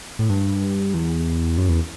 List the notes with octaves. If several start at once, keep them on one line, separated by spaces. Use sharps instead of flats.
A2
G2
E2
F#2
E2